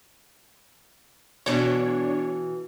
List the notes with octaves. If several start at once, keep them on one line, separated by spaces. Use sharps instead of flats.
B2 E3 D4 C#5